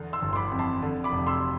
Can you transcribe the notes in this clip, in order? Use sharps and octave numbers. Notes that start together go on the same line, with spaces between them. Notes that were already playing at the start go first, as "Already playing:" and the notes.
Already playing: E2 D3
C6 E6
G1
C6
B5 D6
F2
A5 C6
D3
B5 D6
F1
C6 E6